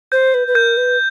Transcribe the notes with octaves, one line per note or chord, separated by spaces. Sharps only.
C5 G6
B4
B4
A#4 G6
B4